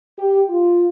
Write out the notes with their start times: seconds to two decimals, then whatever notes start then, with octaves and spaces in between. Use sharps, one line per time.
0.19 G4
0.49 F4